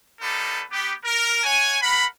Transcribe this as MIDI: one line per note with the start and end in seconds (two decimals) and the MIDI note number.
0.21 0.62 55
0.21 0.62 58
0.21 0.62 63
0.21 0.62 69
0.21 0.62 71
0.71 0.93 59
0.71 0.93 67
1.05 1.42 70
1.44 1.78 73
1.44 1.78 78
1.44 1.78 80
1.82 2.05 70
1.82 2.05 78
1.82 2.05 83